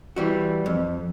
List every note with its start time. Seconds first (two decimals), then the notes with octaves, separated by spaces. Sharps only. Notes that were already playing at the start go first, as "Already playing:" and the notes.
0.16 E3 G3 F#4
0.66 F2